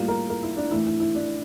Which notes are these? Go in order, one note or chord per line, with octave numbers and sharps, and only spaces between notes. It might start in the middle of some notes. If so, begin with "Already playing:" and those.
Already playing: A2 G3 A#3 F4
A#4
A#4
E4
D4
A2 E3 A3 E4
E4
E4
D4